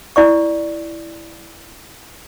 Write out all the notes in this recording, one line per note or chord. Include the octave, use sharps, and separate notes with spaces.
E4 D5 C#6